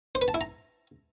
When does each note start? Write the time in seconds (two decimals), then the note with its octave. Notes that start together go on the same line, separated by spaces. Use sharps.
0.15 C5
0.22 B4
0.28 A5
0.34 E4
0.41 A#5